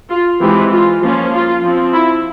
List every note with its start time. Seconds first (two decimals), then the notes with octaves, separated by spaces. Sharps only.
0.10 F4
0.40 E3 G#3 C4 E4 G4
0.71 F4
1.01 F3 A#3 C#4 F4
1.32 F4
1.63 F3 C4
1.93 E4